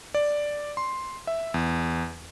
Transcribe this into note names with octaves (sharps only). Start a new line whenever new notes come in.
D5
C6
E5
E2